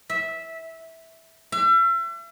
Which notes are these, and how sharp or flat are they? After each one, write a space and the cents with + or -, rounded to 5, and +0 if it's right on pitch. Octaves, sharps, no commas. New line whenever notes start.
E5 -15
E5 +40